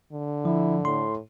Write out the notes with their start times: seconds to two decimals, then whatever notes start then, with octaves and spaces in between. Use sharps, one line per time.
0.12 D3
0.45 F3 E4
0.85 A2 C6